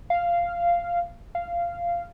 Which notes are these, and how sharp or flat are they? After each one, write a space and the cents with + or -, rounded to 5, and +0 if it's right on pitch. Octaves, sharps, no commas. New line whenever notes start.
F5 -10
F5 -15